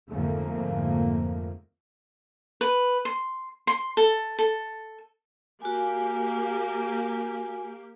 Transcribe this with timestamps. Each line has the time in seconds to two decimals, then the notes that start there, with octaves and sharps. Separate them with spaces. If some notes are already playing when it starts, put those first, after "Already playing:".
0.11 F2 G#2 D3 F3 A3 A#3
2.61 B4
3.05 C6
3.67 C6
3.97 A4
4.39 A4
5.62 A#3 F#4 G4 G#5